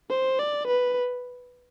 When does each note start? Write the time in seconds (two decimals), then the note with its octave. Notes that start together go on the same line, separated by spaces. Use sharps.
0.10 C5
0.39 D5
0.67 B4